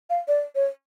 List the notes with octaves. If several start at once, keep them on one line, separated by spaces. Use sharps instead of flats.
F5
D5
C#5